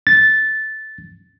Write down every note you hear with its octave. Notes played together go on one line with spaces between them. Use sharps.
A6